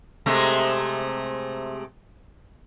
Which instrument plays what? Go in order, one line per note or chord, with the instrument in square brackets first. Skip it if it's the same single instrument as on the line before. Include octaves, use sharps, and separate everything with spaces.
[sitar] C3 G#3 A3